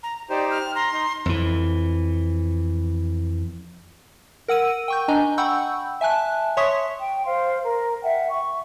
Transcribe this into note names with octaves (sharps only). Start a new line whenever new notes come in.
A#5
D#4 G4 C5 D5
F6
A#5 C6
D#4 A#5
F2 E3
A#4 F#5 E6 D#7
G5 C#6 G6
D4 D#5 G#5 A#5
F#5 G5 B5 C#6 E6 G6
E5 G#5 A5 F#6
C#5 E5 C6 C#6 D#6 B6
G5
C5 F5 C6
A#4 A#5
E5 F#5 G5
C#6